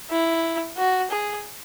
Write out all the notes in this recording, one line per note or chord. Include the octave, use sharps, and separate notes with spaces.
E4
F#4
G#4